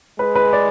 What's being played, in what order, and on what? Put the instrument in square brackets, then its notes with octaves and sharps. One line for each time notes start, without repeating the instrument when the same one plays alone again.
[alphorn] G#3 [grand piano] B4
[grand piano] B4
D5